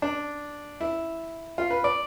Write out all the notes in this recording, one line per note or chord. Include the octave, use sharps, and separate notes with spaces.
D4
E4
F4
B4
D5